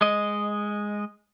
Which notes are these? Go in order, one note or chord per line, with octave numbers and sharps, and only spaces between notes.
G#3 D#5